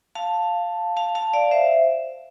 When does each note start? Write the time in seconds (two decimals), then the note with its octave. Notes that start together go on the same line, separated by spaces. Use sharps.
0.15 F5 A5
0.97 F5 A5
1.15 F5 A5
1.33 D5 F5
1.51 C5 E5